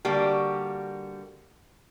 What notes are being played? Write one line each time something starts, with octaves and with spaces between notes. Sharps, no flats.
D3 G3 A#3 F#4 G4